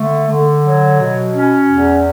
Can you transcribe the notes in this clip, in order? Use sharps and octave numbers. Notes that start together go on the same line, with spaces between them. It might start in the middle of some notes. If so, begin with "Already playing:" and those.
Already playing: D3 A3
D3
F#3
B2
C#4
E2